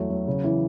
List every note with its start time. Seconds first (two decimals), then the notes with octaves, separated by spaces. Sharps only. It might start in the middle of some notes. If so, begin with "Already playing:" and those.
Already playing: E2 F#3 A3
0.10 F#3
0.27 C#3
0.44 E3